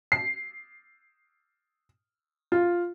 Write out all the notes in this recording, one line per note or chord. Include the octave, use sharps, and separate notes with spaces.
C7
F4